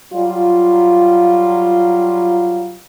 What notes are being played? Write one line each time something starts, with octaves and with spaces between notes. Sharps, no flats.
F#3 G3 F4